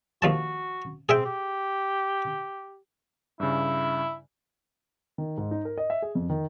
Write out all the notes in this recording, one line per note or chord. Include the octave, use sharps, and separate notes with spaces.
D#2 F3 F#4 A5
C4 G#4 E5 G5
G4
G2 C#3 E4
D#3
G#2
D#4
A#4
D#5
E5
G#4
F2
D#3